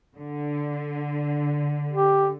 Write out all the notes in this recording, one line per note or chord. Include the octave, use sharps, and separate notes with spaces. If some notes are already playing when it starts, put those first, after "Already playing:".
D3
G4